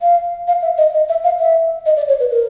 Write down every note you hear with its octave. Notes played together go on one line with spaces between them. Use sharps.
F5
F5
E5
D#5
D#5
E5
F5
E5
D#5
D5
C#5
B4
A#4